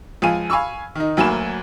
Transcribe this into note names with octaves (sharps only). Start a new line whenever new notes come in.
C#2 F3 F5 G#5 D#7
F5 G#5 B5 C#6 E6
D#3 D#4
D2 F#3 A#3 G#5 B5 E7